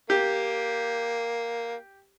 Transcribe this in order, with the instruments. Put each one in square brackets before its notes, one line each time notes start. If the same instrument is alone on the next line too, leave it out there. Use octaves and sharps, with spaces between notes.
[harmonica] A#3 [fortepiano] G4